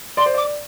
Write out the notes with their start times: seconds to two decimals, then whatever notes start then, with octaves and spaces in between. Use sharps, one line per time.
0.17 D5 C6
0.26 C5
0.34 D5 D6